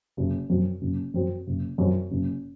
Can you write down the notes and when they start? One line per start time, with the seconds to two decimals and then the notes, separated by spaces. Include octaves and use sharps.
0.17 F#1
0.50 F#2 F#3 C4
0.81 F#1
1.14 F#2 F#3 C4
1.47 F#1
1.78 F#2 F#3 C4
2.11 F#1